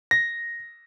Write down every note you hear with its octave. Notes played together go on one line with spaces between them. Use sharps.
A#6